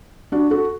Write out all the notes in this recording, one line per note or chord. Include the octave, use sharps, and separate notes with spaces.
D4 F#4
F#4 A4